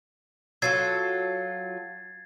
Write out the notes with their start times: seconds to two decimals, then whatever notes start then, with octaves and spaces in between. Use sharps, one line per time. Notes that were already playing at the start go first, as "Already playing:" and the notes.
0.62 F#3 F4 A4 G#6 A6 C7